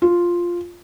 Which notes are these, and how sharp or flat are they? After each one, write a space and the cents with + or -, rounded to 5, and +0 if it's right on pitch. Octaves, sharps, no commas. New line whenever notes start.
F4 +0